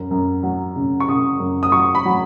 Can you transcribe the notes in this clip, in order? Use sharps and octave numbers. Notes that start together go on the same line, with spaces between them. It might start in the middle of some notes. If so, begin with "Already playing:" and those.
Already playing: F#2
F#2
F#3
C#3
C#6
C#3 D#6
F#2
D#6
F#3 C#6
B5
F#3